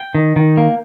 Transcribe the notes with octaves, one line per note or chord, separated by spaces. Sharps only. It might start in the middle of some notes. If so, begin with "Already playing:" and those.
Already playing: G5
D#3
D#3
A#3